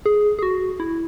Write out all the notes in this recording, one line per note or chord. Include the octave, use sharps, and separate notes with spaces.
G#4
G#4
F#4
E4